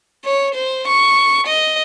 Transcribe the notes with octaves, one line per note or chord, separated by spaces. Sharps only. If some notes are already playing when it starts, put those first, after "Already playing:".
C#5
C5
C#6
D#5